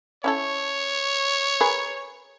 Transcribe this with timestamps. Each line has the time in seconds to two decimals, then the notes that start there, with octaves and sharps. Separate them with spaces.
0.24 C#4 E4 A4 C#5
1.61 G#4 A#4 B4